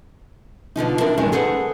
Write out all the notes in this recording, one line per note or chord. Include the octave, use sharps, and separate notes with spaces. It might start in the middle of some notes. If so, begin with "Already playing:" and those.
B2 D3 F3 D#4
C4 D4 E4 A4 A#4
G2 D#3 F#3 G#3 C#4 D#4
G#4 A4 B4 C5 F#5